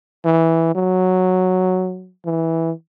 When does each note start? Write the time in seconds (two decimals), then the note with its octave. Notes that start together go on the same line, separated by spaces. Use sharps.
0.25 E3
0.75 F#3
2.26 E3